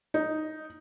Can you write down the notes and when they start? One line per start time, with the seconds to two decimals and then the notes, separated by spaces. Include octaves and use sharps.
0.14 D#4